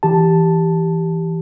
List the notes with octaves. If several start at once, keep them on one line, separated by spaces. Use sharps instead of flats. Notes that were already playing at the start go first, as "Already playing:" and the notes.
E3 G4 A5